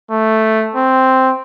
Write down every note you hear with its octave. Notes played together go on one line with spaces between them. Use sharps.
A3
C4